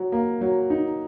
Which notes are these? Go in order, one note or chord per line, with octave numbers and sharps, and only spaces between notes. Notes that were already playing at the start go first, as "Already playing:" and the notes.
Already playing: F#3
A#3
F#3
D#4